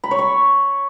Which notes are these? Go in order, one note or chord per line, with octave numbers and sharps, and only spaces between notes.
B5
C#5
C#6